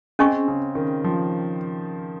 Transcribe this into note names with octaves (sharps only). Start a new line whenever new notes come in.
C4 C#4 G#4 D#5 G#5 C#6
C#3
D#3
F3